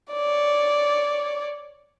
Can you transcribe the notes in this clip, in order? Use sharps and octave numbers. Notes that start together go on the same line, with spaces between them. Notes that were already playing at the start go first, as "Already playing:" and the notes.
C#5 D5